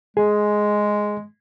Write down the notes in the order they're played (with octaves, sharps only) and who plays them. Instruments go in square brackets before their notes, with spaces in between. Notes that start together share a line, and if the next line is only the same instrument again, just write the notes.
[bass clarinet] G#3 [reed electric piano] G#4